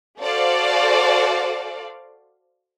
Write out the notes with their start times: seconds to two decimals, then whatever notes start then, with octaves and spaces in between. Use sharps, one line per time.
0.21 F#4 A4 C5 D5 F5